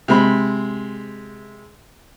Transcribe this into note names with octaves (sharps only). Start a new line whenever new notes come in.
C3 G#3 B5